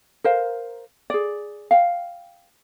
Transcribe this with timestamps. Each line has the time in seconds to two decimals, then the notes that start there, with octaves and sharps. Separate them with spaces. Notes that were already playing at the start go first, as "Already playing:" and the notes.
0.24 A#4 C5 F5
1.10 G#4 D5
1.71 F5 G5